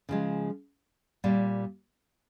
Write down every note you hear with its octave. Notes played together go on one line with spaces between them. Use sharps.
C#3 F3 G#3
A#2 G3 A#3